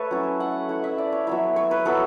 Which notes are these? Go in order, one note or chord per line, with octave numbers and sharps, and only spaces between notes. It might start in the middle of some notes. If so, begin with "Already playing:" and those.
Already playing: A3 A4 B4 C#5
F#3 C#4 E4
F#5
A3 E4 F#5
E5
D5
C#5
F#3 B3 E4 E5
C#5
B4
F#3 B3 E4 A4